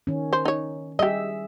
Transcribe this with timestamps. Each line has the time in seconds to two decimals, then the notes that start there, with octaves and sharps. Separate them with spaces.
0.07 D#3 C#4
0.33 C5
0.45 D#4 C#5
0.99 G3 G4 G#4 D#5 E5